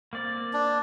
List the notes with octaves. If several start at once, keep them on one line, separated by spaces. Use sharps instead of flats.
A#3 C4 D5
D4